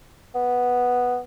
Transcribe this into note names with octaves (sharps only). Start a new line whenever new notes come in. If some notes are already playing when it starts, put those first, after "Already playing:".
B3